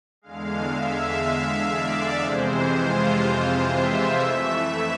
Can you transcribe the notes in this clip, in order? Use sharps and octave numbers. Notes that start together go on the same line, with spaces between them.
E2 D3 G#3 F5
E5
E5
D5
F2 C3 E3 G#3 C5
F4
E5
F2 E3 A3 E5